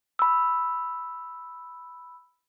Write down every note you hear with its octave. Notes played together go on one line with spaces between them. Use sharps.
B5 E6